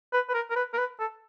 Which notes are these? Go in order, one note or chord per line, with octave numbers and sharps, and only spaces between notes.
B4
B4
A#4
A#4
B4
A#4
B4
A4